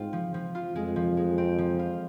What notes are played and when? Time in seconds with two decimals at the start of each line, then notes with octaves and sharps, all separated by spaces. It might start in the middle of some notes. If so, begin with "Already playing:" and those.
Already playing: G#2 G#3 C4 F4
0.13 F3
0.34 F3
0.55 F4
0.76 F2 G#3
0.96 F3
1.17 G#3
1.38 C4
1.58 F3
1.79 F4